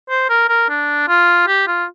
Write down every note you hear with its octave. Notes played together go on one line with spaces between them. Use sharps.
C5
A#4
A#4
D4
F4
G4
F4